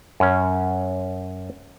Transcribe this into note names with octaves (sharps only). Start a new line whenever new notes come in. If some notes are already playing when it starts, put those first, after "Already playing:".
F#2 C#4